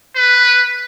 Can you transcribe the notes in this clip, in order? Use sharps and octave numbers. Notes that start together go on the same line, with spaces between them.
B4